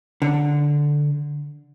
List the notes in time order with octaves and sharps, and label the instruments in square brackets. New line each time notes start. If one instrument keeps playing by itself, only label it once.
[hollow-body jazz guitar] D3